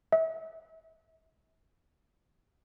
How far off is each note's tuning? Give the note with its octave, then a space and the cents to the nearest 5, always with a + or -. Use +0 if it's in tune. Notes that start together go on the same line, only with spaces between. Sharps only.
E5 -35